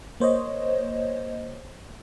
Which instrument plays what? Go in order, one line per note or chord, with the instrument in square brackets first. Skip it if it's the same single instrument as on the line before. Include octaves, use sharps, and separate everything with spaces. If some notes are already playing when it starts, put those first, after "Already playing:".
[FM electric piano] A#3 C5 C#5 D#5